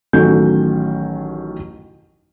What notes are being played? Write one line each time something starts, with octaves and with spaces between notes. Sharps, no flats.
A1 D#3 F#3 C#4 A4 G6